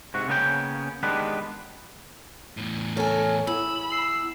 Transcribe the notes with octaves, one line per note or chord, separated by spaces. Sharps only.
G#2 C3 F#4
C#3 A#3 B3 C#4 C#5 G5
D#3 G#3 B3 D4 G4 B4
E2 A2
A4 A#4 C#5 G#5
E2 B5 E6
E6 C7